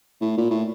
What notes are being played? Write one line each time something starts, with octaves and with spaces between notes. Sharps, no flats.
A2
A#2
A2